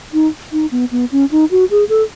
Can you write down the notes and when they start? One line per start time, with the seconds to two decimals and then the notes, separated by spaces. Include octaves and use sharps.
0.13 D#4
0.52 D#4
0.71 B3
0.92 B3
1.12 C#4
1.31 D#4
1.51 F#4
1.71 G#4
1.89 A4